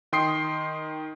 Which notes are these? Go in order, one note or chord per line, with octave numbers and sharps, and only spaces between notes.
D#3 G5 C6 D#6 C7